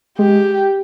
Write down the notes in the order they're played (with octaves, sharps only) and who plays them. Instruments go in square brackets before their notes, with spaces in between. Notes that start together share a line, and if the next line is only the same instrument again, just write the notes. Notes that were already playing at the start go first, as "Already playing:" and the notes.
[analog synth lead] G#3 [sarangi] G4